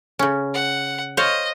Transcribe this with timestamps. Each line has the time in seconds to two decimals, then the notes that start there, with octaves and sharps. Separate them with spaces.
0.19 C#3 C#4
0.54 F#5
1.17 C5 C#5 D#5 F5